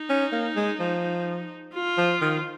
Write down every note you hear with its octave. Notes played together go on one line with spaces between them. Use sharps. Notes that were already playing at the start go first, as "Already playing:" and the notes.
Already playing: D#4
C#4
A#3
G#3
F3
F4
F3
D#3